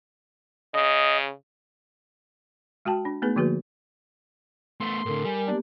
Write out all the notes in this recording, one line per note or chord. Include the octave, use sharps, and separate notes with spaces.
C#3 D#5
G#3 F#4 G5 A5
D4
A3 B3 D#4 G#4 B4
D3 F3 A#3 F#4 G#4 B4
A3 B3 C6
A2 D3 A4 A#4
G3 A#4 G#5
A#3 B3 D4 G4